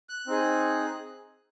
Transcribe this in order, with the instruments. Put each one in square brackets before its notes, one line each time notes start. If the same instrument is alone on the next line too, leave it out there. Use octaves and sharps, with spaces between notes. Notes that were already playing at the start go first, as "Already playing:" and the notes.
[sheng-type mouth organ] F#6
C4 D#4 G#4